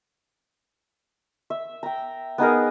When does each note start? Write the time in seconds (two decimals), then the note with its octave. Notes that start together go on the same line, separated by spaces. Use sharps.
1.50 E5
1.83 G5 A#5
2.38 B3 D#4 G#4 A#4